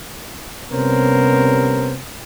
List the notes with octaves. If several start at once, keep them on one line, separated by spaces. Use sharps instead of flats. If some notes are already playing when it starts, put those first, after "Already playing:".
C3 G3 B3 C#4 A#4 C5